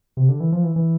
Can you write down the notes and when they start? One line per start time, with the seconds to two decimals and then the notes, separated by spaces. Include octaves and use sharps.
0.17 C3
0.29 D3
0.40 E3
0.52 F3
0.64 E3
0.76 E3